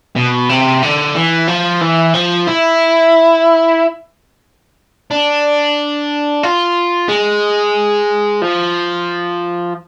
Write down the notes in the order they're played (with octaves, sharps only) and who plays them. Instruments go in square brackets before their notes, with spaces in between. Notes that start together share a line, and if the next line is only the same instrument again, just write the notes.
[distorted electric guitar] B2
C3
D3
E3
F3
E3
F3
E4
D4
F4
G#3
F3